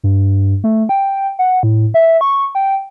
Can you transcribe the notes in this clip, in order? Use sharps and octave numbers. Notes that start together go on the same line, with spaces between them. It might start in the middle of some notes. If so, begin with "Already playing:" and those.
G2
A3
G5
F#5
A2
E5
C#6
G5